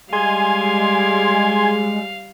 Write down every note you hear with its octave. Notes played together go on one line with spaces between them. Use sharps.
G3 G#3 F5 G#5 C6 G#6